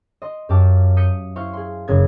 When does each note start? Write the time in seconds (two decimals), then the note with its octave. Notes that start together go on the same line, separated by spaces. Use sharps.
0.22 D#5 C6
0.49 F#2 G4 F5 A5 D6 E7
0.97 D#6 G6 B6 C#7 D#7
1.36 E4 C5 F5 C#6
1.53 G#4 C6
1.88 F#1 C#3 G#4 G#6